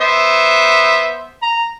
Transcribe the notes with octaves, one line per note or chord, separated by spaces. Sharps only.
B3 C5 E5
A#5